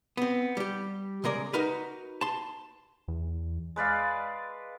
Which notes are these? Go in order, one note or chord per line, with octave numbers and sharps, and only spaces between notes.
B3 C4
G3 G4
C#3 G#3 A#4 D5
D#4 F#4 A#4 B4
A5 C6
E2
G#3 B4 D5 F5